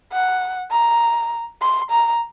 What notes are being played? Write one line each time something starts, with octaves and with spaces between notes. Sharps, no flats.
F#5
A#5
C6
A#5